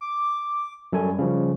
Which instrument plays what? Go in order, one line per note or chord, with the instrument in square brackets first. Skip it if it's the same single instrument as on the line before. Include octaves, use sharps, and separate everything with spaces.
[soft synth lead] D6
[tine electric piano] F#2 A4 G#5 [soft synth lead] G3
[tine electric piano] C#3 F3